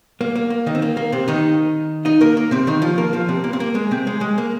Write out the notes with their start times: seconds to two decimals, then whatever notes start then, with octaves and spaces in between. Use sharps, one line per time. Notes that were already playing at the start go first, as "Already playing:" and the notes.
0.21 A#3
0.36 A#3
0.50 A#3
0.66 D#3 D#4
0.75 C4
0.82 A#3
0.97 A#3
1.12 C3 C4
1.28 D#3 D#4
2.05 D#4 D#5
2.21 A#3 A#4
2.37 A#3
2.51 C3 C4
2.67 D#3 D#4
2.82 F3 F4
2.98 A#3 A#4
3.13 F3 F4
3.28 C3 C4
3.44 A#3
3.53 C4
3.60 A#3
3.75 G#3
3.91 C3 C4
4.07 G#3
4.21 G#3
4.38 A#3